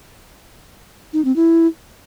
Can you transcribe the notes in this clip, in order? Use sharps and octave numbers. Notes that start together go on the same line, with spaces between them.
D#4
C4
E4